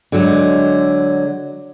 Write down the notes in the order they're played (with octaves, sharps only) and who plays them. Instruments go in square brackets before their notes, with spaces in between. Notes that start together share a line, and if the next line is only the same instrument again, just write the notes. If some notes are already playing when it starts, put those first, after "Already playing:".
[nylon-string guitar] D3 F#3 G#3